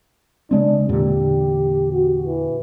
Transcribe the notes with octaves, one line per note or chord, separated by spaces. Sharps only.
C#3 G#3 C4 D4
E2 A#2 D3 G4
F#4
E3